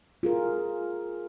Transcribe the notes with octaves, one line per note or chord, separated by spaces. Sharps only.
F4 G#4 A#4